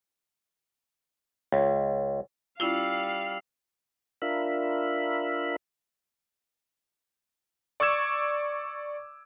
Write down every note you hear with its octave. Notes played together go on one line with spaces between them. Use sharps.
C#2
G3 C#4 E4 F4 F5 E6 C7 F7
D4 F4 A#4 E5 B5
D5 C#6 D6 E6 G#6 E7